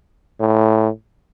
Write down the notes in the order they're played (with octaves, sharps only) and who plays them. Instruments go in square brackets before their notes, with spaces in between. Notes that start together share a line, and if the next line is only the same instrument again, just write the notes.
[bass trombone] A2